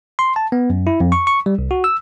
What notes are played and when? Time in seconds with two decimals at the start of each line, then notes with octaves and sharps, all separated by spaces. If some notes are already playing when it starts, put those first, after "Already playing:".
0.19 C6
0.36 A5
0.52 B3
0.70 F#2
0.87 E4
1.00 F2
1.12 C#6
1.27 C#6
1.46 G3
1.59 C2
1.71 F#4
1.84 E6